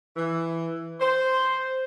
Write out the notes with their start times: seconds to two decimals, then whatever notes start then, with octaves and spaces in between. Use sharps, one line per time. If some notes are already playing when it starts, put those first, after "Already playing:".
0.16 E3
1.00 C5